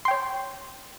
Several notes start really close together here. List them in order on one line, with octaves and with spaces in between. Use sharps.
C6 G5 C#5